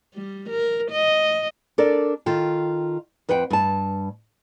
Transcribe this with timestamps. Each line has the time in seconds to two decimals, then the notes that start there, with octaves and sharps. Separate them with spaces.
0.14 G3
0.49 A#4
0.91 D#5
1.78 D4 A4 A#4 D5
2.26 D#3 F4 A4 G5
3.29 F2 B4 C5 F#5 G5
3.50 G2 A5